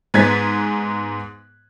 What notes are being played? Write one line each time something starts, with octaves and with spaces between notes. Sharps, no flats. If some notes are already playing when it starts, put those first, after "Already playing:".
G#2 G#3 B3 G#6 A6 B6